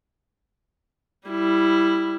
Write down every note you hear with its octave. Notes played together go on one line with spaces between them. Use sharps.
G3 E4